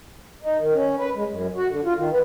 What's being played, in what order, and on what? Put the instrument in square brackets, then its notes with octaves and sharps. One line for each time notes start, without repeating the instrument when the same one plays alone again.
[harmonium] D#4
D#3
C#4
B4
G#3
F#2
F#4
D3
F4
D#3
B3